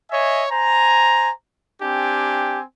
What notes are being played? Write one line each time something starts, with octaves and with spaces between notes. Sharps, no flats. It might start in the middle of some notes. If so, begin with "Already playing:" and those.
C#5 D#5 E5 G#5
C5 G#5 A#5
C4 D4 G4 G#5